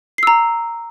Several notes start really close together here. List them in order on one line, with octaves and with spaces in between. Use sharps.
C7 E6 A#5